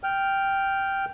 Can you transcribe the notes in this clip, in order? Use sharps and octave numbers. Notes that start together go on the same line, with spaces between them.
G5 F6